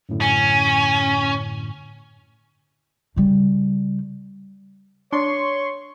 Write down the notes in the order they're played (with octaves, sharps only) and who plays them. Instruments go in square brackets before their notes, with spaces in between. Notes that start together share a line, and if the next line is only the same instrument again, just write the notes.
[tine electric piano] F#2 A2 D3
[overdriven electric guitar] C#4 [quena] G#5
[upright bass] C#3 G3
[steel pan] D4 [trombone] C#5 [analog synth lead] C6 [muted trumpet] C#6